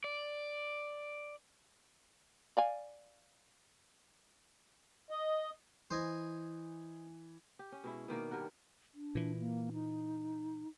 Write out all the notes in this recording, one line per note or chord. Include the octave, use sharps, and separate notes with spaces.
D5
D5 F5 G#5
D#5
E3 C5 D#5 G#5
G4
C#4
B2 G#3 E4
B2 D#3 A#3 D5
G2 G3 A#4 F#5
D4
A#2 E3
A#3
D#4